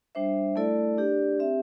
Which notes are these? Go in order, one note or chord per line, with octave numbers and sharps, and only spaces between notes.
G3 D4 C5 E5
A3 E4 A4 D5
D4 G4 D5
C4 G4 E5